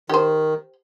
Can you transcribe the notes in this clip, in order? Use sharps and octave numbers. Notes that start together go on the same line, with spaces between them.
D#3 G4 C5